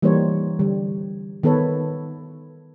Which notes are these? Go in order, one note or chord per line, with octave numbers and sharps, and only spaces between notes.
E3 G3 A#3 D#4 C5 C#5
D3 G3
D#3 B3 A4 B4 C#5